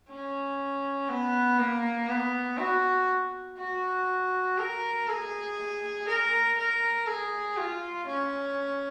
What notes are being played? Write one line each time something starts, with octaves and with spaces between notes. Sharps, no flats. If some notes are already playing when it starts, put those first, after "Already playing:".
C#4
B3
A#3
B3
F#4
F#4
A#4
G#4
A#4
A#4
G#4
F4
C#4